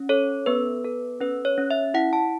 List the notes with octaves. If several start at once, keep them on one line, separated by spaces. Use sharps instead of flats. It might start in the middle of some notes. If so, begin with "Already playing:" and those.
Already playing: C#4
A4 C#5
B3 B4
A4
C#4 B4
C#5
C#4
E5
E4 F#5
A5